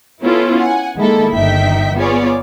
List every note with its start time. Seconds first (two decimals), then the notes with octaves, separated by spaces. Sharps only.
0.22 B3 C#4 E4 F4 A4 B4
0.59 F#5 G#5
0.96 D#3 G#3 A#3 E4 A4
1.33 G1 D#3 D#4 E5 G5 B6
1.95 B3 F4 G#4 C#5 D5